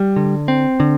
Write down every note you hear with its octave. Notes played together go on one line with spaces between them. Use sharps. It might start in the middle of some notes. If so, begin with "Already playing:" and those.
Already playing: G3
D3
C4
D3